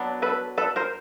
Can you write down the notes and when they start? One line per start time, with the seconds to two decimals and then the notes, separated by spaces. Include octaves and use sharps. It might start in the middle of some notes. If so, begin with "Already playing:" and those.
Already playing: F#3 B3 D4
0.22 A4 B4
0.58 A4 B4
0.76 A#4 C5